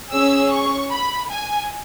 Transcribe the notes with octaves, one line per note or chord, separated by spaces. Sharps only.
C#4 G#4 E6
C#6
B5
G#5